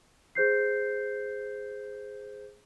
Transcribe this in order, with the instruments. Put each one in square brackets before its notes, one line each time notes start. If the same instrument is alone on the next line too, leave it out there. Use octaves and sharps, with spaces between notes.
[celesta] G#4 C5 G6 C7